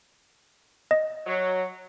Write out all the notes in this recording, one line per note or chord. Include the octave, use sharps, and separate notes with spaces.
D#5
F#3